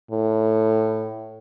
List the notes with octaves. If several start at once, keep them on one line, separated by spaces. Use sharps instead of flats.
A2